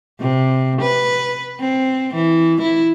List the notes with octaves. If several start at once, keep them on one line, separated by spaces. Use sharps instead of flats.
C3
B4
C4
E3
E4